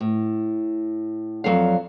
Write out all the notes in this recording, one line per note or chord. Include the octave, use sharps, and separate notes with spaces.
A2
F2 F#3 A4 D5 F5